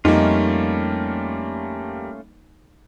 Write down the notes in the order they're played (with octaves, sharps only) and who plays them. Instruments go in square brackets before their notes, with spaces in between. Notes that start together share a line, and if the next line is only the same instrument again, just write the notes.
[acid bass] F2 [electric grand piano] G3 A#3 [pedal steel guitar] A3 C#4 F4 [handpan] D#4